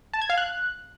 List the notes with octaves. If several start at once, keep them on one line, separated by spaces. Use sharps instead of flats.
A5
G#6
F5
F#6